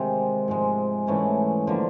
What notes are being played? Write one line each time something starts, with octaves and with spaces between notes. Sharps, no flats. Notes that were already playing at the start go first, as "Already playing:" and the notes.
Already playing: C3 D#3 G#3
G#2 F3 G#3
G#2 E3 A3 C#4
D3 F3 A#3